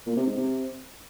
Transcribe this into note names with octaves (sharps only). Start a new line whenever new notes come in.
A#2
C3
G#2
C3